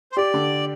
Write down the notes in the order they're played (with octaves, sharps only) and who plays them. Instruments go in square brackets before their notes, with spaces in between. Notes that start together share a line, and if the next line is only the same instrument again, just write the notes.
[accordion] C5
[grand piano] G4 [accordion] D5
[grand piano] D3